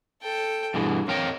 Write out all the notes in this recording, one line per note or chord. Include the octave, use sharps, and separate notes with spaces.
A4 G5
G2 B2 E3 G#4
F2 A#4 C#5 G5